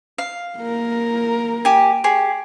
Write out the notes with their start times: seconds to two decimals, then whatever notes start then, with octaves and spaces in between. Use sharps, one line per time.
0.18 F5
0.59 A#3 A#4
1.65 G4 G#5
2.04 G4 G#4 C#6